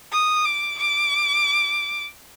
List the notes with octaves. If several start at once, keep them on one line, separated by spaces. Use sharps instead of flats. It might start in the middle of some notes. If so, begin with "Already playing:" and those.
D#6
D6
D6